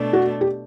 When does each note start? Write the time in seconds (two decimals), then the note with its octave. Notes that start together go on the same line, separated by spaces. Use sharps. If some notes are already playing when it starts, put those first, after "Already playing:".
Already playing: B2 A3 D4
0.13 F#4
0.41 G4